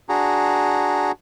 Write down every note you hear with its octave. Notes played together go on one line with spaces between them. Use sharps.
D4 F#4 G#4 A#5